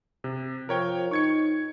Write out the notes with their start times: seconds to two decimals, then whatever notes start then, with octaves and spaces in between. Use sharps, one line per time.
0.24 C3
0.69 F3 A#4 C#5 G5
1.11 D#4 C#6 G#6 C#7